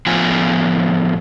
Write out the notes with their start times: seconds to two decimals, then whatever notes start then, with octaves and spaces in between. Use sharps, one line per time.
0.06 A2 F3 B3 F4 G#5